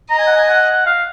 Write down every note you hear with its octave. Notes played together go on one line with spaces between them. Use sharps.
D#5 A#5
G#5
F#5
G#5
F#5
F5